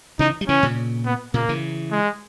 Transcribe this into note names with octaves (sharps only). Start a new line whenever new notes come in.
C#3 E3 D#4
G3
C#3 E3 C#4
A#2 C#3
B3
A#2 C#3 A#3
C#3 E3
G#3